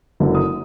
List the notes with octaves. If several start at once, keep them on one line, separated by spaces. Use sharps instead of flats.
F#1 F#2 D3
D#6